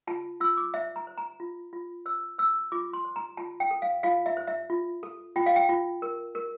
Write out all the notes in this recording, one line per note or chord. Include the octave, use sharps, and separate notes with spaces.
F4 A5
F4 E6
D6
C5 E5
A#5
C5
A#5
F4
F4
C5 E6
C5 E6
F4 D6
C6
C5
A#5
F4 A5
G5
A4
F5
F4 F5
E5
C5
E5
F4
A4
F4 G5
F5
G5
F4
A#4
A#4